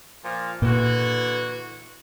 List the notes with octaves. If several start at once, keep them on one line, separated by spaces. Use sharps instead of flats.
A#2 F3 F5
A#2 D3 E3 F#4